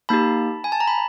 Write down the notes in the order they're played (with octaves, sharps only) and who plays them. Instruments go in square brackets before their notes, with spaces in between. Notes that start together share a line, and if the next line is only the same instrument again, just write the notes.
[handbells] A#3 D#4 G4 A5 B5
G#5
A5
A#5
B5